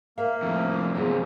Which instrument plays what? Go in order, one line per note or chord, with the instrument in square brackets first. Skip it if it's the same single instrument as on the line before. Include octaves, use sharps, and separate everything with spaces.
[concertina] A#3 [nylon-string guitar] A#4 E5 F5
[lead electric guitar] F2 A2
[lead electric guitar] F#2 C3 [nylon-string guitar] B3 F4 G#4